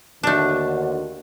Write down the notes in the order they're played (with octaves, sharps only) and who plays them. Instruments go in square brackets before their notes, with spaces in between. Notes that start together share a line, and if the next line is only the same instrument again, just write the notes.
[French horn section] D#2 D3 F#4 [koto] A3 D4